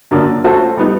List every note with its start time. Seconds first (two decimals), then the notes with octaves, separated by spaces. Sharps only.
0.11 F#2 D3 F#3 A#3 D4
0.44 A3 C#4 F#4 A4 C5
0.77 G3 B3 D#4